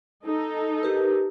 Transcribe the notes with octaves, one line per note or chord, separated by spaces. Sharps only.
D#4 A4
G4 A#4 B4